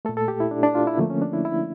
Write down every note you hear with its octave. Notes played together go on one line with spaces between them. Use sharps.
A#2 A3 A4
A4
G4
E4
D4
D4
F4
E4
D3 F3 A3 A#3
C#4
D4
E4
E4